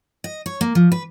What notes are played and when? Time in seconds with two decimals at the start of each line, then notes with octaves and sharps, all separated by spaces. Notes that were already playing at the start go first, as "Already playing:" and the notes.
0.24 D#5
0.46 C#5
0.61 A#3
0.75 F3
0.92 B4